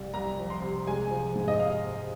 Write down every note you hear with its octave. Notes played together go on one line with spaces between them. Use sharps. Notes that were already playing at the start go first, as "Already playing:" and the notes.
Already playing: C2 C3 F3
C2 A#5
F3
C6
C3
G#3 G#5
F3
G#2
D#5
F5